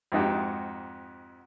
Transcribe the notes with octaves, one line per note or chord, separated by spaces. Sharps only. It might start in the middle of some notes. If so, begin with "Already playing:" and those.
F2 G#2 D#4 F#4 G4